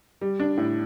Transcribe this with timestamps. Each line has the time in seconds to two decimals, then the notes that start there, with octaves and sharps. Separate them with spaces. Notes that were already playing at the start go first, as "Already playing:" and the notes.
0.21 G3
0.40 D4
0.57 A2